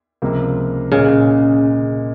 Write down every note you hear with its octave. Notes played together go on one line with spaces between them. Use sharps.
C#2 C3 F3 A#3
A#2 C#3 G#3